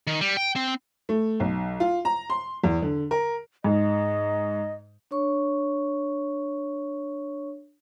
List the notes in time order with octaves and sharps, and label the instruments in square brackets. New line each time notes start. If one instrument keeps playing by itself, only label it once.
[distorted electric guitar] D#3
G3
G5
C4
[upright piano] A3
B1
F4
A#5
C6
E2
D3
A#4
[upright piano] G#2 [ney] D#5
[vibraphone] D4 C#5 C#6